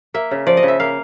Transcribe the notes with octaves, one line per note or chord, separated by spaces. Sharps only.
A#3 E5
C#3
F3 D5
D#5
C#3
E5
A#3 F5